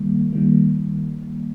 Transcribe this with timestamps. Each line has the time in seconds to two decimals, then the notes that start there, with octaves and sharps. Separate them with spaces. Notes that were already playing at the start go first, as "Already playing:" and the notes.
Already playing: D#3 G3 A#3
0.33 D#3 G3 A#3